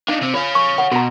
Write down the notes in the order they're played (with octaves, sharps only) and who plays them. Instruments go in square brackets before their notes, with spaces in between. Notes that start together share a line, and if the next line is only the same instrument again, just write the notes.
[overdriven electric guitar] D4 D#4 [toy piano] F5
[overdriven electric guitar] C3 C4
[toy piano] F4 [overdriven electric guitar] C#5 F5
[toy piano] C#6
F#5
[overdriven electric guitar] B2 [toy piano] F#4 A#5